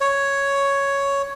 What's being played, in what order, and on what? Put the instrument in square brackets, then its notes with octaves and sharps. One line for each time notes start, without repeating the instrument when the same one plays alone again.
[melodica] C#5